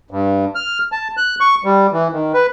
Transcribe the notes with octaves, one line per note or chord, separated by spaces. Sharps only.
G2
F6
A5
F#6
C#6
G3
E3
D#3
B4